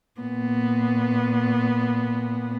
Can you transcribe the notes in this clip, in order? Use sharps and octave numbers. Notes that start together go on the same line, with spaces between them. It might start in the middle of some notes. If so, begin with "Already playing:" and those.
A#2 B3